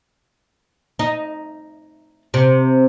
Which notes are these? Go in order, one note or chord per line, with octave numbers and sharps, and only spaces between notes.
D#4
C3